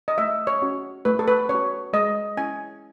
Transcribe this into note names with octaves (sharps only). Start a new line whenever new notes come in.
D#5
A3 E5
C#5
C#4 F#4
A3 B4
A4
B4
C#4 F#4 C#5
G#3 D#5
C#4 E4 G#5